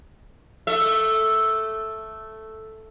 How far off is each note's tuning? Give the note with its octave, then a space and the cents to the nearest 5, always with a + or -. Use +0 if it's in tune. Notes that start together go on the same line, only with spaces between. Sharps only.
A3 +0 E5 +0